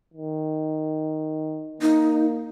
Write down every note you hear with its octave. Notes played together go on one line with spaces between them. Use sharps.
D#3
A#3 D#4